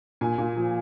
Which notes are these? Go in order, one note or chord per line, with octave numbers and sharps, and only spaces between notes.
A#2 G#5
A#2
F3